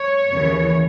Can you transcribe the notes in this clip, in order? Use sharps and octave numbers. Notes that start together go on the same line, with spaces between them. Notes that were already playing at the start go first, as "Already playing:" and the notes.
Already playing: C#5
D#2 C#3 E3